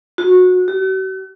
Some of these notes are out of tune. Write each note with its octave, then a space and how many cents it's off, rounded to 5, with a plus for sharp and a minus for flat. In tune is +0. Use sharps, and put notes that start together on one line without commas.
F#4 -20
F#4 +45